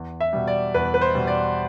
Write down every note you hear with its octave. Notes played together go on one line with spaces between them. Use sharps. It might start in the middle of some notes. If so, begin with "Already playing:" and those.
Already playing: E2
E5
B2 G3
D5
E2 B4
B4
C5
B2 G3
D5